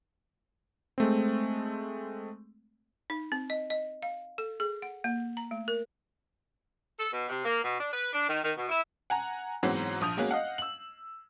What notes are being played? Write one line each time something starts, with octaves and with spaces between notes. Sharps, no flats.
G#3 A3 C4
D#4
C4
D#5
D#5
F5
A4
G#4
F#5
A#3
A#5
A3
A#4
A4
B2
C3
A#3
B2
D4
B4
D4
D#3
D#3
B2
E4
F#5 G#5 A#5
G#2 E3 F#3 B3 C4
A#1 F3 D#6 G6 F7
G#3 A#3 B3 C#4 F#4
D#5 F5 F#5
E6 F#7